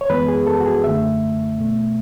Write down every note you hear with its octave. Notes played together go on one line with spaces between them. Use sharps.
C#5
F#2 E3 G#3 B3 B4
G#4
A4
F#4
G#4
F#2 D3 A3 E5
B2 A3